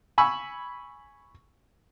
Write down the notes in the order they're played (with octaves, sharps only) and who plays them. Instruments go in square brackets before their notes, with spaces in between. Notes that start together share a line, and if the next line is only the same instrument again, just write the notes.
[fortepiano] G#5 B5 C#6 E6